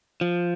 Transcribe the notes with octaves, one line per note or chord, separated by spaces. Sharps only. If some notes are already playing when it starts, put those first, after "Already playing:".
F3